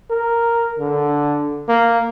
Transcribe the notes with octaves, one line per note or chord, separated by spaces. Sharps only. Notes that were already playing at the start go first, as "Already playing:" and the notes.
A#4
D3
A#3